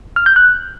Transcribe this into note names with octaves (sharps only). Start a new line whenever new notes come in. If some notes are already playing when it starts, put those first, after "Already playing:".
F6
G6
F#6